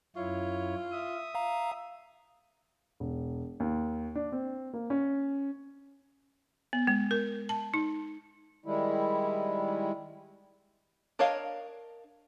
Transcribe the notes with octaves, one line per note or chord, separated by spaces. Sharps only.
F#2 E4 F4 C#5
E5 D#6
F5 A#5
E1
D#2
D4
C4
A#3
C#4
B3
G#3
A#4
A5
D#4
D#3 G3 G#3 E4
D4 A#4 C#5 D#5 F5